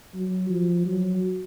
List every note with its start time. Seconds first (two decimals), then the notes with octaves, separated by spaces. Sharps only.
0.15 F#3
0.50 F3
0.86 F#3